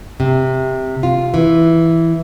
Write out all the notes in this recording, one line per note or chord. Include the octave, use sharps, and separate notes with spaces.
C3
F4
E3